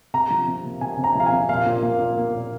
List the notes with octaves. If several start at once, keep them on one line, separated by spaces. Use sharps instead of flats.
C3 A#5
F3
C3
A#3
C3 G#5
C3
A#5
F3 F5
G#5
C3
A#2 F5
A#2
A#3
A#2
A#3
A#2